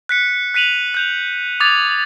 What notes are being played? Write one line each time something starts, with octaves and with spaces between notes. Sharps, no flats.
F#6 B6 C#7
F#6 B6 D#7 F7 F#7
F#6 G6 F7
D6 D#6 G#6 A6 F7